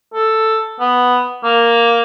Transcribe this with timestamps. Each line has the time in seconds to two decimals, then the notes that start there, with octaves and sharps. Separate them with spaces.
0.14 A4
0.80 B3
1.44 A#3